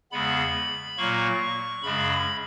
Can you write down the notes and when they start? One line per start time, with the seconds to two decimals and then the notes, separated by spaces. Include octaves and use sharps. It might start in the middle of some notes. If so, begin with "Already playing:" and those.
0.11 E2 C#3 G#3 B3 B5
0.97 A#2 F#3 A#3 C#6
1.83 F#2 C#3 G#3 B5
2.11 B5